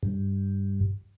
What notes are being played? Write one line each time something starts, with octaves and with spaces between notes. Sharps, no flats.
G2